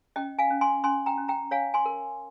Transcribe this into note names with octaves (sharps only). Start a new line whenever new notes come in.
C#4 D#5 G5
F5 G#5
C#4
G#5 C6
C#4 G#5 C6
G5 A#5
C#4
G5 A#5
C#5 F5 G#5
G#5 C6
A#4